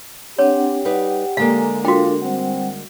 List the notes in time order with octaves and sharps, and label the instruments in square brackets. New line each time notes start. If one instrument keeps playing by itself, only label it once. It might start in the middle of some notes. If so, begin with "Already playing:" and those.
[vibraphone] C4 D4 F#5 [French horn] G4 [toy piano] C#5
[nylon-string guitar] G3 D#4 B4 [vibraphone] F#5
[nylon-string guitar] D3 G#3 A#3 [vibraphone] A4 G#5 A#5 [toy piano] F5
[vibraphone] D4 A4 A#4 [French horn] F4 [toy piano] F#4 G5
[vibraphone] G3 F#5 [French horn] C4